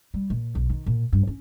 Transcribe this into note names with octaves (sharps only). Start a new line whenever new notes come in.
G3
A#2
B1
D#3
A#2
G2
C#4